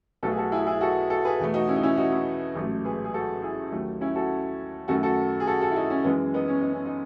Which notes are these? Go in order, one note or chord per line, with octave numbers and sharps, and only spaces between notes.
B1 B2 A3 F#4 A4
G#4
F#4 A4
E4 G#4
E4 G#4
F#4 A4
F#4 A4
G#4 B4
E2 B2 A3
D#4 F#4
C#4 E4
D#4
C#4 E4
D#4 F#4
C#4 E4
A1 G#2 F#3 A3
G#4 B4
G#4
F#4 A4
E4 G#4
D#2 D#3 F#3 A3
C#4 E4
F#4 A4
F#2 D#3 A3 F#4 A4
F#4 A4
G#4
F#4 A4
F#4 A4
E4
D#4 F#4
C#4
F#2 E3 G#3 B3 D#4
B3 D#4
C#4
D#4
C#4
D#4